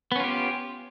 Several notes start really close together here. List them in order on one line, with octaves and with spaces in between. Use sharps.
B3 C#4 F4 G4